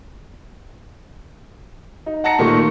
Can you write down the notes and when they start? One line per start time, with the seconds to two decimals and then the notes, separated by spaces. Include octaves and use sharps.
2.06 D#4
2.24 F#5 A5 A#5 A#6 C#7
2.39 A#2 D#3 A3 C#6